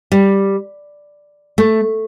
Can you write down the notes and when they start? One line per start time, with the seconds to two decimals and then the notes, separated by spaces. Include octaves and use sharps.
0.12 G3
1.58 A3